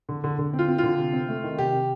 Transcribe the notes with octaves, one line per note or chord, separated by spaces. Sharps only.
D3
D3
D3
C4
F4
C4
D3 F4
C3
C4
A3
D#3
C3 G4
C3